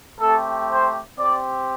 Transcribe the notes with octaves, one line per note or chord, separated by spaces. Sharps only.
A3 C4 G4 A4
C5
C4 G4 D5